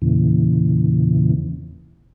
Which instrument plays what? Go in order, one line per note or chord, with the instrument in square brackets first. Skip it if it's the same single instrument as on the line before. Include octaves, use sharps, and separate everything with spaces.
[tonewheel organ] E2 A#2 C#3 E3